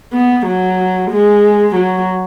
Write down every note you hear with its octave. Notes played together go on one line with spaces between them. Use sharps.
B3
F#3
G#3
F#3